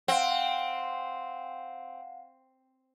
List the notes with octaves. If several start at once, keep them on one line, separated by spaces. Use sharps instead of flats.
C4 F5 F#5